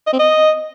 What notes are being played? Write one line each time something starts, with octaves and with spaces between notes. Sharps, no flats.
D#5
C4
D#5